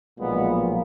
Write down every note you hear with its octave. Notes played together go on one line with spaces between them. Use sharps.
B1 A#2 F3 G#3 B3